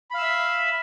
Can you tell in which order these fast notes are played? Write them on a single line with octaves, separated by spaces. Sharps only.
B5 F5 E6 E5